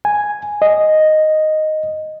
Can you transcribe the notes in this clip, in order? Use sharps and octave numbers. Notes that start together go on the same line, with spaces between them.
G#5
D#5